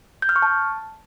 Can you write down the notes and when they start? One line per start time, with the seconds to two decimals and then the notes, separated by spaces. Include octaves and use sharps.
0.22 G6
0.29 F6
0.36 C#6
0.42 A5